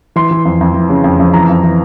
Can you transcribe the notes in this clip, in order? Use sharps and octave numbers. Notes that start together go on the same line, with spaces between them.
E3 C6
E3
F2
F2
E3
C#3
F2
F2
E3 A#5
F2
E3